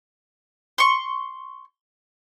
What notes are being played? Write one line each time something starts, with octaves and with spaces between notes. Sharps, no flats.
C6 C#6